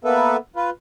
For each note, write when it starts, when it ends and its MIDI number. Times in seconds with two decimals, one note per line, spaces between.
0.04 0.37 58
0.04 0.37 59
0.04 0.37 69
0.04 0.37 71
0.04 0.37 76
0.56 0.70 65
0.56 0.70 71